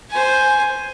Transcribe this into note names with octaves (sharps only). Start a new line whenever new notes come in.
C5 G#5